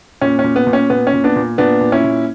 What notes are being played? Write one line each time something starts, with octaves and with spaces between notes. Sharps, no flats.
A#2 C#4
C#4
A#2
B3
A#2
C#4
A#2 B3
C#4
A#2
B3 D4
A#2
A#2 B3 D4
A#2
C#4 E4
A#2